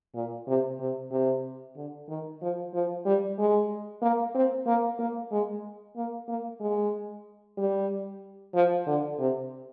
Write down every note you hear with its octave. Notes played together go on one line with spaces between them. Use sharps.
A#2
C3
C3
C3
D3
D#3
F3
F3
G3
G#3
A#3
C4
A#3
A#3
G#3
A#3
A#3
G#3
G3
F3
D3
C3